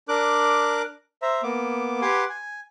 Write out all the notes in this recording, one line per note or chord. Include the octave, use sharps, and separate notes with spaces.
D4 A#4 D6 F#6
C5 E5 A#5
A#3 B3 D6
G4 B4 F#5 G#5 C6 D6
G#5